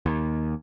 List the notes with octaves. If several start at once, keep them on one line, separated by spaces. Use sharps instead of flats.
D#2